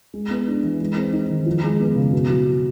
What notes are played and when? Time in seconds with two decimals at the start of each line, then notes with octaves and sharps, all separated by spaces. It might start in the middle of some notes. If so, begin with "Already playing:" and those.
0.14 G#3
0.30 B3
0.48 D4
0.63 E3
0.81 G#3
0.96 C4
1.13 D#4
1.30 D#3
1.46 F3
1.64 G#3
1.80 B3
1.96 C#3
2.12 B2
2.30 F#3